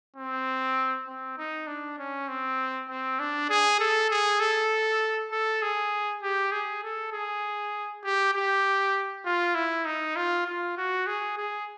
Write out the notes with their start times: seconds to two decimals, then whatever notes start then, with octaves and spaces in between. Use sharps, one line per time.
0.17 C4
1.07 C4
1.38 D#4
1.67 D4
1.99 C#4
2.29 C4
2.90 C4
3.20 D4
3.50 G#4
3.80 A4
4.11 G#4
4.40 A4
5.32 A4
5.62 G#4
6.23 G4
6.52 G#4
6.83 A4
7.13 G#4
8.04 G4
8.34 G4
9.26 F4
9.55 E4
9.86 D#4
10.16 F4
10.46 F4
10.77 F#4
11.07 G#4
11.37 G#4